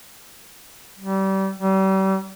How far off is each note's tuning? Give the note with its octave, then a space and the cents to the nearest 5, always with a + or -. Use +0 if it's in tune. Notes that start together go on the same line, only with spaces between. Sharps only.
G3 -30
G3 -35